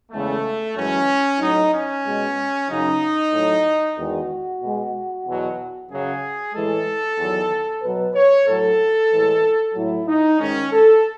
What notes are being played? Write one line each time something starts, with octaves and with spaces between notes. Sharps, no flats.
E2 C#3 G#3 A3
F#2 E3 G#3 C#4
A2 F#3 D#4
C#4
B2 G#3
F#2 C#3 F#3 D#4
A2 F#3
E2 D#3 G#3 F#4
B2 G#3
E2 B2 F#3
F#2 C#3 F#3 G#4
A2 E3 G#3 A4
E2 D#3 F#3
B2 F#3 B4
C#5
A2 F#3 A4
A2 E3 G#3
A2 F#3 E4
D#4
G#2 D#3 G#3 C#4
A4